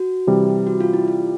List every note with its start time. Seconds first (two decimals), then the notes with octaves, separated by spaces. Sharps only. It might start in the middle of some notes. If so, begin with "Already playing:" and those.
Already playing: F#4
0.27 C3 E3 G3
0.67 F#4
0.80 F4
0.93 E4
1.08 F4